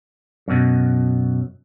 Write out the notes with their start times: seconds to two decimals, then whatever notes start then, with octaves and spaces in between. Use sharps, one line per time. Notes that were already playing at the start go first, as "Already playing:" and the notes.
0.48 F#2 B2